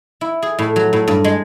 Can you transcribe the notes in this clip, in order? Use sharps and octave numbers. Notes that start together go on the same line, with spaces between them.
E4
G#4
A2
F#3
A2
G2
G#3